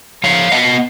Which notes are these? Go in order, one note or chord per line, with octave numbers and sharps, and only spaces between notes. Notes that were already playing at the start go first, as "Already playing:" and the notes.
F3 C#5 F5
B3 D#5 F#5